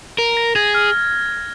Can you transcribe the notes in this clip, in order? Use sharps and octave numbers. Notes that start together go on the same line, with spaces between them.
A#4
A#6
G#4 G#6
F6